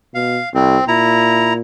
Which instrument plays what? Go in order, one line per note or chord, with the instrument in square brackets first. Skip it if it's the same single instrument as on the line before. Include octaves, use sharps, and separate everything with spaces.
[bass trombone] B2 [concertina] F5
[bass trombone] C2 [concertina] C4
[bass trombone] A#2 [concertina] E4 A#5